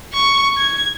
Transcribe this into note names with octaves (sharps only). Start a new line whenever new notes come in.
C#6
G#6